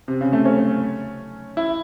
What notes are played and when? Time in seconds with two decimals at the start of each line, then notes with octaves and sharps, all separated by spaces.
0.08 C3
0.21 C#3
0.33 A3
0.45 C#4
1.57 E4